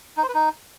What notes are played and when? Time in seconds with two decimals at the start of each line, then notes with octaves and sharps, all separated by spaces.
0.17 D#4
0.23 C5
0.29 B4
0.35 D#4